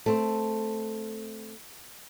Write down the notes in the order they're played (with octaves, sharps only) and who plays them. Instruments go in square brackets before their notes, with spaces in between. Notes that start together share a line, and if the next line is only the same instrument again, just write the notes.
[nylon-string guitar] A3 C4